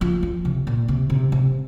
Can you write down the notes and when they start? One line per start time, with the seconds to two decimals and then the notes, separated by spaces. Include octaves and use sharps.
0.01 F3
0.23 F3
0.45 C3
0.67 A#2
0.88 C3
1.10 C3
1.32 C3